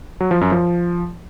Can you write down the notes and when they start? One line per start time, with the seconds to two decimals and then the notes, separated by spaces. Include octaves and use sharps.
0.20 F#3
0.31 F3
0.41 F#2
0.52 F3